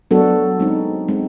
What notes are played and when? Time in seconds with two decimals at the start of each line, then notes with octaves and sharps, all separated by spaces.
0.11 F#3 B3 D4 F#4 A4
0.60 G#3 C4 D#4
1.08 G#3 C4 D#4